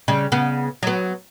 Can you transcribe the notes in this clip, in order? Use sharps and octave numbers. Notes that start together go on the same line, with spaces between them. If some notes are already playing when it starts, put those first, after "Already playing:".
C#3 G3
C#3 B3
F#3 B3